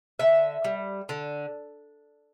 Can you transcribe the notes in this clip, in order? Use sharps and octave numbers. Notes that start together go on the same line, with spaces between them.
D3 E5
G3
D3